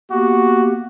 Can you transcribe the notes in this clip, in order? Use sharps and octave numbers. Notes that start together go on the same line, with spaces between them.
A#3 B3 F#4 G4